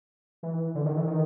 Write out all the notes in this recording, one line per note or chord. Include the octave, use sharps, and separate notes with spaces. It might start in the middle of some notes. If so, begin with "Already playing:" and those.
E3
D3
D#3
E3
D#3